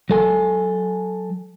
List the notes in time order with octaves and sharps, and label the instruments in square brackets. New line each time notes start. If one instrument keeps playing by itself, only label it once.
[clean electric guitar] F#3 A4 G#5